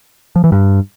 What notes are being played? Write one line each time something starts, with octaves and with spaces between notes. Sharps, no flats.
F3
E3
G2